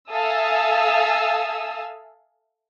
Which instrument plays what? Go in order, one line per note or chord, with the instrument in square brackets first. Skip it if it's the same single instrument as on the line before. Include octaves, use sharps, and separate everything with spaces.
[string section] A4 E5 F5 G#5 D#6 E6